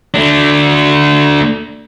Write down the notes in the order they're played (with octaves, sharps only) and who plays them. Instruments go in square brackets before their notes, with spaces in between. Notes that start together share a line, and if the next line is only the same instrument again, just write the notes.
[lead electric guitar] A3 D4